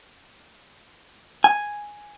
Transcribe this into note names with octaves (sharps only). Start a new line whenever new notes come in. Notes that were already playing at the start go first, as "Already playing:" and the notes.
G#5